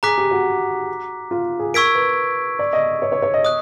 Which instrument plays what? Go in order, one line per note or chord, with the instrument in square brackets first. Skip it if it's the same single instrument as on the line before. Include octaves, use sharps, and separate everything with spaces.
[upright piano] G#4 [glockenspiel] A#5 D6 F#6 B6
[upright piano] G4
F#4
F4
G#4
[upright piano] A#4 [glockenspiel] C#6 E6 G#6 B6 D7
[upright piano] B4
D5
D#5
C#5
C#5
C#5
D#5
[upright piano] D#5 [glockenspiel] D#6 F#6